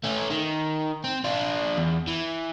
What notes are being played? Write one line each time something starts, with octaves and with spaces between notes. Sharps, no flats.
A3 C#4
D#3
C4
D4 F4
E2
E3